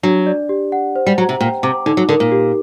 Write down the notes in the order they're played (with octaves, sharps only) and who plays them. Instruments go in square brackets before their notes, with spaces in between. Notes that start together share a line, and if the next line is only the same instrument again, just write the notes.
[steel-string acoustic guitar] F#3 [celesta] D4
[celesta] D5
G4
F#5
C5
[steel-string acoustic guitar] G3
[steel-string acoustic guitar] F#3 [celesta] A#5
[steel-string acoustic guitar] C3
[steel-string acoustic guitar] A#2 [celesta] G5
[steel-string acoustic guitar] C3 [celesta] D6
[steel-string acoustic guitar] D3 [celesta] D#4
[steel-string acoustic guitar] F#3
[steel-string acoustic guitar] D3 [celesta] A#4
[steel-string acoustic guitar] A#2
[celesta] G4